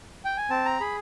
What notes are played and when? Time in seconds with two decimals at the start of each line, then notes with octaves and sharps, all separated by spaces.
0.25 G5
0.37 G#5
0.50 C4 A5
0.65 A#5
0.80 G#4 B5